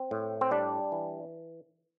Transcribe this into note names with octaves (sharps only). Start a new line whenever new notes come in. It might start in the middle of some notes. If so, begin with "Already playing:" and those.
Already playing: C4
A2
C4
G3 D4
E3